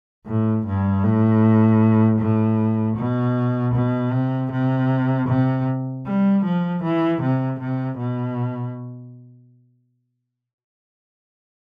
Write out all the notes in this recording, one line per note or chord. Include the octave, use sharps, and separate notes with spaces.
A2
G2
A2
A2
B2
B2
C3
C3
C3
G3
F3
E3
C3
C3
B2